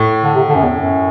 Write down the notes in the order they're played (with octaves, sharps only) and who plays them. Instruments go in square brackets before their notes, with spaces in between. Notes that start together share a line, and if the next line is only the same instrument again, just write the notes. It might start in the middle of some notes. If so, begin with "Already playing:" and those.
Already playing: [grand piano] A2
[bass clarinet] D3
C3
D3
F#2
E2
F#2